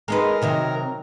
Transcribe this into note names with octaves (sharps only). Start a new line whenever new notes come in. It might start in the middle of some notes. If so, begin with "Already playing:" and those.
G#3 D#4 A#4 B4
C3 D#3 F#3